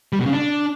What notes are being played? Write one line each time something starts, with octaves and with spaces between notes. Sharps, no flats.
G3
B2
C#3
D4